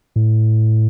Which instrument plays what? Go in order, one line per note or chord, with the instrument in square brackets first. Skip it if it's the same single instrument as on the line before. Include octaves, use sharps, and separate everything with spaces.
[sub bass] A2